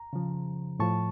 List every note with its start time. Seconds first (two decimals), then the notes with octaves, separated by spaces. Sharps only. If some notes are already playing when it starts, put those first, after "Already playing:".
Already playing: A#5
0.13 C#3 F3
0.79 A2 F3 A5 C#6